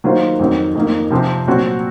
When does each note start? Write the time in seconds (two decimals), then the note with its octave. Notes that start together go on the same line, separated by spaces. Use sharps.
0.04 D#3 F#3 A#3 F4 C5
0.39 F2 D#3 F#3 C4
0.75 F2 D#3 A#3
1.11 C3 F3 C4
1.47 A#2 F#3 C4 F#4